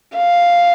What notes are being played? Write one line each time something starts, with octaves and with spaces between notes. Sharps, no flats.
F5